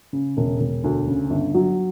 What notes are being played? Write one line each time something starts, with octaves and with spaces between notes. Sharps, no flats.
C#3
E1
E1
D2
C#3
G1
F#3